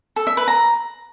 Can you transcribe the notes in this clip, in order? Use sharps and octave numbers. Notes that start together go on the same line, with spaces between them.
A4
E5
B4
A#5